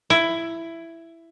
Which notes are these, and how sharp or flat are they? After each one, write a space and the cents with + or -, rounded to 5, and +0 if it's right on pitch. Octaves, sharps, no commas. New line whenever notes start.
E4 +10